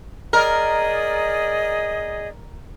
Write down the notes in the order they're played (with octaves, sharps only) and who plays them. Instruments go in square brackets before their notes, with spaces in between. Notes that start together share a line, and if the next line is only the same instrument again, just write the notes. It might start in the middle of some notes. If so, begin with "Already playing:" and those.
[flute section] G#4 D5 D#5 [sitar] A#4